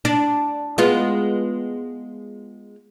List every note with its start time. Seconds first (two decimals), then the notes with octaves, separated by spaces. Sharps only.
0.05 D4
0.78 G#3 B3 F4